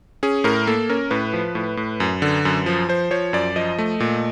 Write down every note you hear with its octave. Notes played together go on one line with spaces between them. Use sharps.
C#4 G#4
A2 A#4
A#3 A4
C#4 A#4
A2 B4
F3
A2
A2
F#2
D3
F#2
F3
F3 C5
F3 C#5
F#2 D5
F3 D#5
A3
A#2